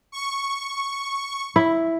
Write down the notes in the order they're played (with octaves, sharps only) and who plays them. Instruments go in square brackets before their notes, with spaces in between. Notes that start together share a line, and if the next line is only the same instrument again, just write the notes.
[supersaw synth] C#6
[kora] E4